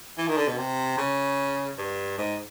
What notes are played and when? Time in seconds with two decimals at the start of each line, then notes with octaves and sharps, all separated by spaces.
0.18 E3
0.28 D#3
0.37 D3
0.48 B2
0.57 C3
0.98 C#3
1.78 G2
2.18 G#2